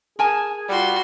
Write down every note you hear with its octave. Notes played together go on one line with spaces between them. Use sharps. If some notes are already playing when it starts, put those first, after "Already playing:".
G#4 A#4 G#5 A5
G3 F4 F#4 C6